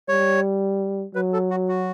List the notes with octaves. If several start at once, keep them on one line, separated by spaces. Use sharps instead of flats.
G3 C#5
F#3 B4
A4
F#4
F#4